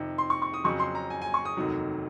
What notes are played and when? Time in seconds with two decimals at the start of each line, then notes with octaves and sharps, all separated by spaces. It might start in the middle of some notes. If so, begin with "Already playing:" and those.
Already playing: F2 C3 D#3
0.18 C6
0.30 C#6
0.42 C#6
0.54 D#6
0.64 F2 C#3 F#3 C#6
0.80 C6
0.95 A#5
1.10 G#5
1.22 G#5
1.34 C#6
1.45 D#6
1.57 F1 D#2 D#3 F#3